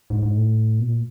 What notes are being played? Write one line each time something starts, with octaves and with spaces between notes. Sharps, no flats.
G#2
G#2
A2
B2
A#2